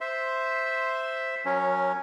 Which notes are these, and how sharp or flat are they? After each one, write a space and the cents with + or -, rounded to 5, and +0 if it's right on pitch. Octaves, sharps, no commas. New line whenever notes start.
C5 +0 E5 +0 C6 +0
F#3 -20 C#4 +0 A#4 +0